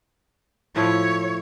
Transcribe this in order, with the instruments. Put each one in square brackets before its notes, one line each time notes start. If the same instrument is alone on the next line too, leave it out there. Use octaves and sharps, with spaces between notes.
[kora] A2 F3 E4 [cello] C#5